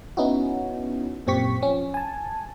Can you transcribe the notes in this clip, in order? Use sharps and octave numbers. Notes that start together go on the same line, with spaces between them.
B3 C#4 D#4 E4 F#4
F#2 A#2 C4 G4 C#6 B6
F3 C#4
G#5 A5